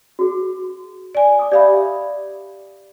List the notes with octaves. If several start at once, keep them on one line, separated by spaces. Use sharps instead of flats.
F#4 G#4
D5 G#5
D6 D#6
G4 D5 E5 F5 B5